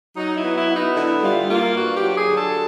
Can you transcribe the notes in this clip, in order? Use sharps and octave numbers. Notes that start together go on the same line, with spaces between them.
F#3 D#4
E4
B3
E4
B3
D#4
D3 E4
G3 F4
A#3 F4
G2 F#4
G4
F#3
G#4
D3
A4